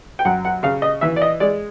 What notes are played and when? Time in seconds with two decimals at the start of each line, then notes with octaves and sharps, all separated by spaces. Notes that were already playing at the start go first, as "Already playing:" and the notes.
0.19 G5
0.25 F#2 F#5
0.45 F#5
0.63 C#3 F5
0.82 D#5
1.01 E3 E5
1.16 D5
1.22 D#5
1.40 G#3 D5